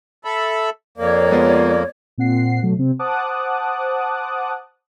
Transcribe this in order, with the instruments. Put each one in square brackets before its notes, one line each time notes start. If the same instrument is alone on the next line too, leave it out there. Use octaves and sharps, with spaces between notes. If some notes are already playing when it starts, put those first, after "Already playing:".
[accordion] A4 E5 B5
[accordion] F2 A#3 [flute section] C#5 D5
[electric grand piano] G#3 B3 F4
[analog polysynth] A#2 C4 F#5 C7
B2 F#3 A3
C3 C4
C5 F#5 A5 D6 D#6 F#6